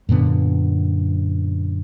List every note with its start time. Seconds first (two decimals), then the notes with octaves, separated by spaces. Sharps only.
0.09 F#2 A#2 D3 B3